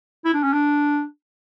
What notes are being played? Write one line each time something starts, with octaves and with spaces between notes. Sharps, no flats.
E4
D4
C#4
D4